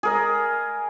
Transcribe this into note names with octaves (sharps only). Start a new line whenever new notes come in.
G#4 A#4 D#5